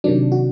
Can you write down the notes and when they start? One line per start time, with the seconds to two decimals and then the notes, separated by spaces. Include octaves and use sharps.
0.04 C3 D#3 F#3 D4
0.32 F#4